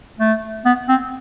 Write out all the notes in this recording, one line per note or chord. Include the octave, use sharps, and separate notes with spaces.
A3
B3
C4